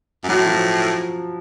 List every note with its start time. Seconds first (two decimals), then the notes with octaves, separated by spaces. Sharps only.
0.24 F#2
0.28 A2 F#3
0.46 F3